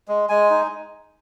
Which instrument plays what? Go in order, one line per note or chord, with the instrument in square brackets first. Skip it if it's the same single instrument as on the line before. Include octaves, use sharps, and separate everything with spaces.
[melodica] G#3
G#3 G#5
D#4